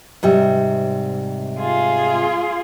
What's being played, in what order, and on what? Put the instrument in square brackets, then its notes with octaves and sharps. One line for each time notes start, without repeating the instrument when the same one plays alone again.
[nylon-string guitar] G#2 C3 G3
[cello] F4 G#4